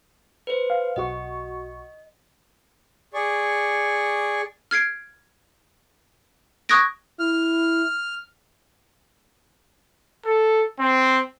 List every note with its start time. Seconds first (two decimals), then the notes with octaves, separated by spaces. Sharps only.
0.47 B4 C5
0.70 F5
0.96 B1 F#4 D#5 C#6
3.14 G#4 D5 C#6
4.71 F6 G#6 C7 D7
6.69 C#6 D#6 F#6 G#6 A#6 D7
7.19 E4 F6
10.25 A4
10.79 C4